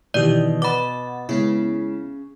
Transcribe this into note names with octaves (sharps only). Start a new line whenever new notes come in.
B2 D#3 E3 G4 D5
B4 F#5 B5 D6 A6
C#3 G#3 B3 E4